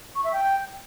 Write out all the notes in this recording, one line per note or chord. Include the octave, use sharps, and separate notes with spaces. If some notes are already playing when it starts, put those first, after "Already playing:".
C#6
E5
G5